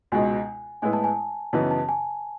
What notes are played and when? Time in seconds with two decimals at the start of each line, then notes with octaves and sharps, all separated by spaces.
0.12 C#2 B2 G#3 D#4 G#5
0.82 A2 G#3 B3 E4 G#5
0.93 A5
1.04 G#5
1.53 F#2 C#3 E3 B3 D#4 A5
1.71 A5
1.89 G#5